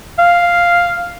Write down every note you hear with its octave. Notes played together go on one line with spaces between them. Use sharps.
F5